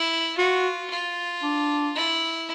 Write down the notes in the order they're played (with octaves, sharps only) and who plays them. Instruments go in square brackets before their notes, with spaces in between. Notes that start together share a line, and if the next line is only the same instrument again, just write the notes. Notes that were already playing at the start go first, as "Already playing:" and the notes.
Already playing: [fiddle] E4
[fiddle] F4 [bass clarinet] F#4
[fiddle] F4
[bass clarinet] D4
[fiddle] E4